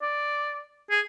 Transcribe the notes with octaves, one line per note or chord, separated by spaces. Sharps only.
D5
G#4